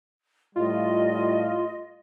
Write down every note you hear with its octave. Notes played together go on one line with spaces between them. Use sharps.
A2 G3 F4 D#5